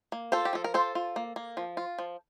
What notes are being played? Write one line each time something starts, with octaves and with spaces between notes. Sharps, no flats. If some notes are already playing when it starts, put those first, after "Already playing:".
A#3
F4 A4 C5
G4
F3 A4
A#4
F4 A4 C5
F4
A#3
A#3
F3
F4
F3